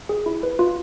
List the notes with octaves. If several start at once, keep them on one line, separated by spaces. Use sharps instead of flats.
G#4
E4
B4
F4